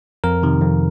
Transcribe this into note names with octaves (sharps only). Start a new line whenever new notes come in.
F2 A#4
C3 D#3
F2